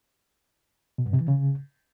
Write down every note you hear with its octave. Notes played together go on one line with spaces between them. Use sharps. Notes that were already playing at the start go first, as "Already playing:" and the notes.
B2
G2
C3
E3
C#3